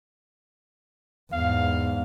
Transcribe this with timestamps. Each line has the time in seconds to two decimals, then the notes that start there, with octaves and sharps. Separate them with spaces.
1.33 E2 G#2 F5